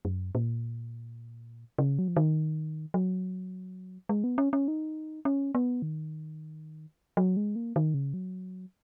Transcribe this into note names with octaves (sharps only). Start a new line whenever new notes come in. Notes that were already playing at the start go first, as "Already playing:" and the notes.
F#2
A#2
C#3
F#3
F3
D#3
F#3
G#3
B3
C#4
C#4
D#4
C#4
B3
D#3
F#3
G#3
A#3
D#3
C#3
F#3